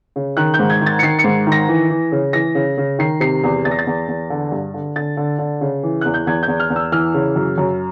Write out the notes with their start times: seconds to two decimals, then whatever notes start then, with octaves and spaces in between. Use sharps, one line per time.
0.16 C#3
0.37 D#3 F#6
0.54 G6
0.59 G#2
0.70 G#6
0.81 D#3
0.86 A6
0.99 C#7
1.03 D#3 C7
1.19 C#7
1.24 G#2
1.47 D#3 A#6
1.68 E3
1.90 E3
2.12 C#3
2.33 E3 A#6
2.55 C#3
2.78 C#3
2.99 D#3 C7
3.20 C3 C7
3.43 E2
3.65 E2 A6
3.71 A#6
3.79 A6
3.87 E2
4.08 E2
4.30 D3
4.52 G2
4.74 D3
4.96 D3 A6
5.17 D3
5.39 D3
5.61 C#3
5.83 E3
6.01 E2 F#6
6.14 G6
6.27 E2 G#6
6.43 G6
6.48 E2
6.60 F6
6.70 E2
6.76 E6
6.92 E3 F6
7.14 C#3
7.36 F#2
7.58 F#2